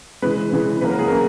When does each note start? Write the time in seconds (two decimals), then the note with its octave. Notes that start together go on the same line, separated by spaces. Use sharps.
0.22 C#3 E3 G#3 B4
0.52 C#3 E3 G#3
0.81 C#3 F#3 A#3 B4
0.90 A#4
0.99 G#4
1.07 C#3 F#3 A#3 A#4